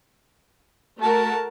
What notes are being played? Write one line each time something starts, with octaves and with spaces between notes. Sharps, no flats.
A3 F#4 A#4 A5